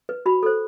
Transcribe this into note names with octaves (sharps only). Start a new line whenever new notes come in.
B4
F#4 B5
A4 C5